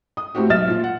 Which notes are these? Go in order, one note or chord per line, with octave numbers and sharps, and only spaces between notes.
D#6
A2 A3 C4 F#4 G4
B1 G#2 E5 F6 A6 E7
A#2 F3 F4
F#5